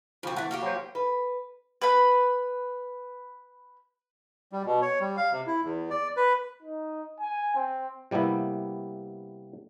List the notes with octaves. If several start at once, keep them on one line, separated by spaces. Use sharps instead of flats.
D2 F3 C4
E3 A3 F#5
A#3 F#4 G4
F#3 C5
B4
B4 B5
G3
B2
C#5
G3
F5
C3
E4
E2
D5
B4
D#4
G#5
C4
C3 G3 A#3 B3 E4